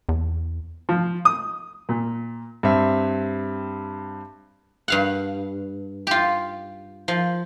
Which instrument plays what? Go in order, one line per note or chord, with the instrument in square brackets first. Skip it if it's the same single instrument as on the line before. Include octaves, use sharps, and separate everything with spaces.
[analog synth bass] E2
[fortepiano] F3
D#6
A#2
[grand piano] G2 C4 E5
[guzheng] G2 F5 F#5
F4 G4
F3